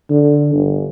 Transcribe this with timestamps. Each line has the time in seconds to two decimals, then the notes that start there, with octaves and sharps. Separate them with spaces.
0.10 D3
0.54 G1